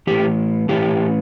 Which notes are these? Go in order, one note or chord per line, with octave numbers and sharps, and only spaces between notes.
A2 E3 G4
A2 E3 G4